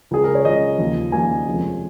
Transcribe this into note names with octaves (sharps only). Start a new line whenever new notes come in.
C#2 C#3 G#3 G#4
A#4
C#5
C#2 C#3 G#3 D#5
D#2 C#3 F3 A#3
D#2 C#3 F3 A#3 G#5
F1 F2 F3 G#3 C#4